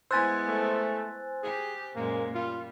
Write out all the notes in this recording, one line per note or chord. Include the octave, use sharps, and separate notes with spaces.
G#3 B3 E4 C5 G#5 E6 F#6 A6
A3
G4 G#4
F#2 A#2 G#3 A#3
G3 F4